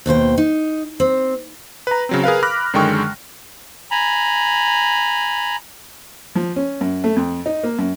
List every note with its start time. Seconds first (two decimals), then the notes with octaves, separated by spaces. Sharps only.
0.06 D#2 B2 C5 G5
0.38 D#4
1.00 C4
1.87 B4 A#5
2.09 C#3 F#3 C4
2.24 G#4 A#4 B4 F5
2.43 B5 D6 F6 F#6 A#6
2.73 F#2 D3 D#3 G#3 G5 C#6
3.91 G#5 A#5 B5
6.35 F3
6.56 C#4
6.81 F#2
7.04 A3
7.16 F2
7.46 D#4
7.64 A#3
7.78 F#2